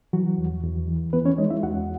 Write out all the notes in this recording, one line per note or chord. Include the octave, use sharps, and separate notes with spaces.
E3 F#3 F#4
E2
E2
E3
E3 B3 B4
C#4 C#5
G#3 D#4 D#5
E4 E5
E2 F#4 F#5